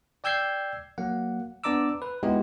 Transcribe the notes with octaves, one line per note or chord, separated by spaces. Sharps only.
D5 G5 E6 G6 G#6 C7
F#3 A#3 F#5
B3 D4 D5 A#5 D6 E6
B4
G#3 B3 D#4 E4 F#4 G4